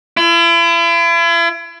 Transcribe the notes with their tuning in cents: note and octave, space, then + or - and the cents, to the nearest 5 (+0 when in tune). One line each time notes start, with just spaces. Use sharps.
E4 +40